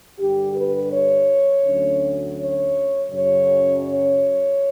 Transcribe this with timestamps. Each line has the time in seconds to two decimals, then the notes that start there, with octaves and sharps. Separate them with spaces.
0.18 G2 D3 G3 G4
0.54 B4
0.91 C#5
1.64 D2 D3 F#3 C#4
2.37 C#5
3.10 F#2 C#3 F#3 C#4 C#5
3.84 C#5